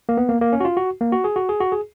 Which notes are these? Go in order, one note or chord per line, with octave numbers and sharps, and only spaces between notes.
A#3
B3
A#3
A#3
C#4
F#4
F4
F#4
A#3
F#4
G#4
F#4
G#4
F#4
G#4